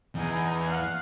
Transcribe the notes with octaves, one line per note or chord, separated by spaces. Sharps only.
E2 D#4 G#4
F5 F#5